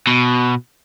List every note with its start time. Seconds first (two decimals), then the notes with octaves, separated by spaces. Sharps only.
0.07 B2